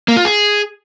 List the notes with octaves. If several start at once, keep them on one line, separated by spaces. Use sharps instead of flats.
A#3
F4
G#4